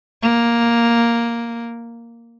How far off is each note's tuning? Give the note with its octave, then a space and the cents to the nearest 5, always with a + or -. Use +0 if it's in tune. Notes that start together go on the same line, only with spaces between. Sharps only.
A#3 +5